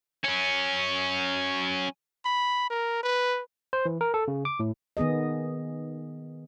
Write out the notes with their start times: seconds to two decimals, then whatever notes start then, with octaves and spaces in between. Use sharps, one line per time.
0.24 F#3 C#4
2.25 B5
2.70 A#4
3.03 B4
3.73 C5
3.85 E3
4.01 A#4
4.14 A4
4.28 C#3
4.45 D6
4.60 A2
4.97 D#3 B3 G#4 D#5